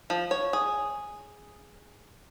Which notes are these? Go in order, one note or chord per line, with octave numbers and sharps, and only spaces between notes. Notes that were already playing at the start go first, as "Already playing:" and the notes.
F3
C#5
G#4